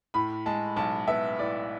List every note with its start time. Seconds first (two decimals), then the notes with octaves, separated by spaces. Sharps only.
0.14 A2 B5
0.46 G#3 A5
0.76 B1 A5
1.08 B3 E5
1.39 A2 D5